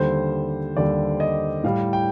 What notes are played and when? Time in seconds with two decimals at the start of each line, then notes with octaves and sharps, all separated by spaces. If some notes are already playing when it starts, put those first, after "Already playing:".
Already playing: D#2 D3 G3 C5
0.77 D#2 D3 G3 D5
1.20 D#5
1.64 A2 G3 F5
1.93 G5